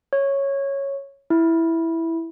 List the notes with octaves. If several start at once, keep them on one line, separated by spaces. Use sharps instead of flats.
C#5
E4